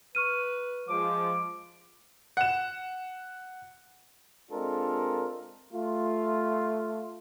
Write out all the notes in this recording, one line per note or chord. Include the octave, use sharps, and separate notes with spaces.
B4 C#6 F6 D#7
F3 G#3 D6
F#5 E7
G#3 C4 D4 F4 A4 A#4
A3 F4